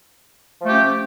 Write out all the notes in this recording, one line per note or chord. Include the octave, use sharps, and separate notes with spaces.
F3 A3 C#4 G4